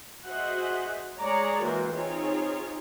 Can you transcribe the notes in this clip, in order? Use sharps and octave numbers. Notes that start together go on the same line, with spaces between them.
F#4 G#4 C5 D#5 E5 F#5
G#3 G#4 C#5 D5 A#5
E3 G#3 A#3 F#4 A#4 C5
C4 D#4 F4 G#4 C#5